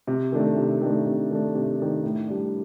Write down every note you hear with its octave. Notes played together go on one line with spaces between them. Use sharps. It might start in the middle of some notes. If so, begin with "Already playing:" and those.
C3
D#3 A3 D4
C3
D#3 A3 D4
C3
D#3 A3 D4
C3
D#3 A3 D4
A2
G3 D4